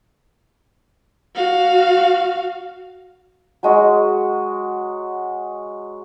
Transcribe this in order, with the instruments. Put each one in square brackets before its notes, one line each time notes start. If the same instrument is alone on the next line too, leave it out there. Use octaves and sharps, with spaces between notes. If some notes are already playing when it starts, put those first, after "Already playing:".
[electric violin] F#4 F5
[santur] F#3 G#3 F#4